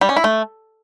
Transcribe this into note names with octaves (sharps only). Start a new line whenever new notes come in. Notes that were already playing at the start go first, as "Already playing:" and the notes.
G3
C#4
E4
A3